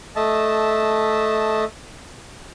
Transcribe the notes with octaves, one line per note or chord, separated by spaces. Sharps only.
A3 D#5 E5 A5